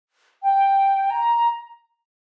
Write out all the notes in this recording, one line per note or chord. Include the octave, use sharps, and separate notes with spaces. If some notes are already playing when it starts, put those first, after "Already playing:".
G5
A#5